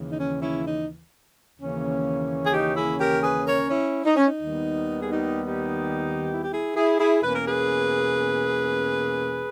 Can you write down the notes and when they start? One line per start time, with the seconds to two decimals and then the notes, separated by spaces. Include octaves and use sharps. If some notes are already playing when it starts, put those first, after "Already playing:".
Already playing: D#2 C#3 E3
0.11 D#4
0.18 C#4
0.41 C#4 E4
0.65 D#4
1.58 D#2 C#3 E3 A#3 C#4
2.46 G#4
2.53 D#4 G4
2.76 E4 G#4
3.00 G4 A#4
3.23 G#4 B4
3.46 A#4 C#5
3.70 C#4 E4
4.05 D#4
4.16 C#4
4.26 D#4
4.40 D#2 D#3 G3 B3
5.00 G#4
5.11 D#4 G4
5.46 D#4 G4
6.33 E4
6.42 G4
6.51 E4 G#4
6.75 E4 G#4
6.99 E4 G#4
7.22 E2 B2 A#3 C#4 B4
7.34 A#4
7.46 G#4 B4